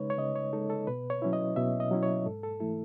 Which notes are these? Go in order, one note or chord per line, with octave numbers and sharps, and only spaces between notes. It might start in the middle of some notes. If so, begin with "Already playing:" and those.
Already playing: C#3 G#3 D#4 B4 C#5
C#5
C#3 D#5
C#5
G#3 D#4 A4
A4
B2 B4
C#5
F#3 C#4 E4
D#5
B2 E5
D#5
F#3 C#4 E4
C#5
G#2 A4
A4
E3 A3 E4 A4